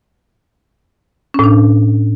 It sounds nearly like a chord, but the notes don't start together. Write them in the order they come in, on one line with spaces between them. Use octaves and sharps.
C#4 A2 D4